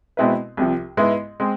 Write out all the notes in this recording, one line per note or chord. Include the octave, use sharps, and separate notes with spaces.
B2 G#3 C4 E4 B4
C2 C3 F3
G#2 G#3 B3 E4
G#3 C4